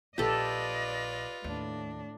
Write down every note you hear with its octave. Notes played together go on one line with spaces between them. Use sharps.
A#1 F4 G4 A4 B4 D5 D#5
D#2 A2 D4